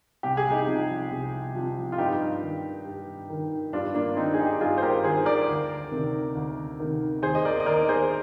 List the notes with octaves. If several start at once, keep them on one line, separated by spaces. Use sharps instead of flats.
C2 G4
G#4
D#4 G4
C3 F3
C2
C3 F3
F4
G2 D#4 G4
D#3
G2
D#3
G2 D4 F4
A#3 D4
D#3 C4 D#4
G#4
D#4 G4
G2 F4 G#4
C5
G4 A#4
D#3 G#4 C5
A#4 D5
D2
C3 D#3
D2
C3 D#3
D#2 G#4 C5
D#5
A#4 D5
D#5
D#3 A#4 D5
G#4 C5